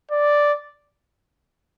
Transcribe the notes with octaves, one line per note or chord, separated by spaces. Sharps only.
D5